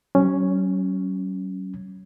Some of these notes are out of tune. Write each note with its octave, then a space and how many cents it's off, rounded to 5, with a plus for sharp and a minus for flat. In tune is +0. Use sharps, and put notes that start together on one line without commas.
F#3 +35 C#4 +0